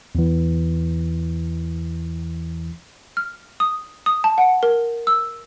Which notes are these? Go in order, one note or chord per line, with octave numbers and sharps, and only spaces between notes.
E2 E3
F6
D#6
D#6
A5
F#5
A#4
E6